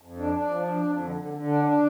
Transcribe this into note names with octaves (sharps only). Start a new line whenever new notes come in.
F2
D4
D4
F3
D4
F2
D3
D3
D3
D4
D4